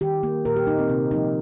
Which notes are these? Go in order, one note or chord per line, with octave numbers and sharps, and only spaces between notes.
D#3 G4
A#3
A#2 A#4
G4
A#3 D#4
C4
C3 C4
F3 A#3 D#4